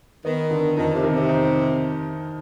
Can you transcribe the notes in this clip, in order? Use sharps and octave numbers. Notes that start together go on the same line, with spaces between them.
D#3 B3
D3
F2 D#3
C3
D#3
C3
D#4